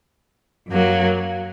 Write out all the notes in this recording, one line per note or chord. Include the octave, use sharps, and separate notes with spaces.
F#2 F#3 A#3